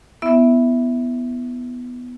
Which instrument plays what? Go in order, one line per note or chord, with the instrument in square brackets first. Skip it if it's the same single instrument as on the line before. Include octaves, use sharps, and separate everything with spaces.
[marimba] B3 E4 E5